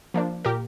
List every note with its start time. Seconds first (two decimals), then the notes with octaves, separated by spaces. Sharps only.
0.14 F3 A#3 D4
0.45 A#2 G4 A#4